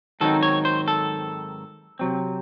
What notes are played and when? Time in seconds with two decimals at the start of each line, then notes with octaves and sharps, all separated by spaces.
0.21 G#2 D#3 F#3 C4 D#4 A4
0.43 C#5
0.65 C5
0.88 A4
1.99 C3 F#3 C4